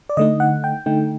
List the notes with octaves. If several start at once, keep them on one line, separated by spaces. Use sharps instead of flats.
D5
D3 A3 D#4 D#5
F#5
G5
D3 A3 D#4 G5